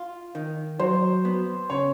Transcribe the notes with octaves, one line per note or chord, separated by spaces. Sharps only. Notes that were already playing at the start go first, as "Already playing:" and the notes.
Already playing: F4
D#3
F#3 C5
B3
C#3 C#5